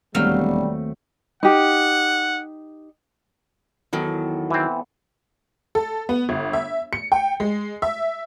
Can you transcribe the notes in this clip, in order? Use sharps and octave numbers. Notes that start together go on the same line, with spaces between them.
E1 D#2 F#3 G3 A3 C4 F5 G5
D#4 G4 F#5
E2 D#3 F#3 B3 A4
E3 C4
A4
B3
G1
E5
C#7
G5
G#3
E5